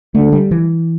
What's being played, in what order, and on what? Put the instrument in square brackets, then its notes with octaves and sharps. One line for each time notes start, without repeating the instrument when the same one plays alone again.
[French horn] D3 [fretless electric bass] A3
[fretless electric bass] G3
E3